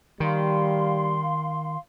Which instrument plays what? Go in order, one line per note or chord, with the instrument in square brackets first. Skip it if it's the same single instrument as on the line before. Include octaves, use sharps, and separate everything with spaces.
[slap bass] D#3 [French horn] G3 [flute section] F5 C6